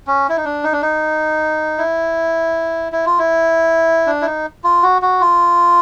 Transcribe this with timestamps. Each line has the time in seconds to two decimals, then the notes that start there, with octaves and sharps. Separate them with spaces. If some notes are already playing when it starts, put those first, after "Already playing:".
0.07 C#4
0.29 E4
0.37 D#4
0.45 D4
0.64 D#4
0.73 D4
0.82 D#4
1.78 E4
2.92 E4
3.06 F4
3.19 E4
4.07 D4
4.22 E4
4.26 D#4
4.64 F4
4.83 F#4
5.02 F#4
5.21 F4